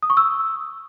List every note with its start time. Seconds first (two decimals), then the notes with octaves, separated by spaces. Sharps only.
0.03 D#6
0.10 C#6
0.17 E6